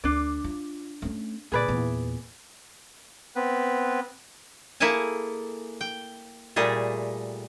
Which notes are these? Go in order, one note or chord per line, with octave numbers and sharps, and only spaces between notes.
D2 D4 D5
F4
A3 C#4
A#2 D3 G#4 B4 D5
E2 A#2
B3 C4 B4
A#3 E4 G#4 A4 G#5 A5
G5
A#2 G3 A3 G#4 A4